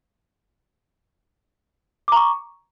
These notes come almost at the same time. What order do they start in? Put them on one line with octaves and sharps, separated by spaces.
D6 A#5 C#6